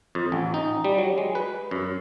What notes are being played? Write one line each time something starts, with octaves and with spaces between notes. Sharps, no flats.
F2
A1
D#4
G3
F#3
G#3
B4
F#2